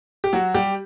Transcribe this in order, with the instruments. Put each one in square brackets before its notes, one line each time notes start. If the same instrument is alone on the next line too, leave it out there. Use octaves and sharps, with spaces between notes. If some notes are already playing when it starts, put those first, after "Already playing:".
[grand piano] G4
F#3 F#4
G3 G4